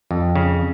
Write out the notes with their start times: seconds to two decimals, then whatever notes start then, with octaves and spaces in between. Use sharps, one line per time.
0.11 F2
0.35 C#3